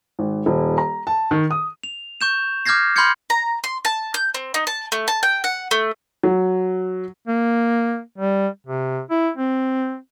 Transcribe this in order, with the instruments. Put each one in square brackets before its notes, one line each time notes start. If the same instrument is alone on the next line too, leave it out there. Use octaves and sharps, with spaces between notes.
[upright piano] G#1
D#1
A#5
A5
D#3
D#6
[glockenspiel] F7
C#6 G6 E7
D6 F6 G6 G#6 A#6 C7
B5 C6 F6 G6 G#6 C#7
[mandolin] A#5
C6
A5
G6
C4
D#4
A5
A3
A5
G5
F#5
A3
[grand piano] F#3
[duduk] A#3
G3
C3
E4
C4